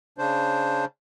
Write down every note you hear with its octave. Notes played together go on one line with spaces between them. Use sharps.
C#3 D4 C5